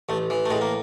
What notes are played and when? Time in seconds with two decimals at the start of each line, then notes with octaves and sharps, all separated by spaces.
0.09 A1 A3
0.30 E3
0.46 A3
0.50 A2 G#3
0.62 A#3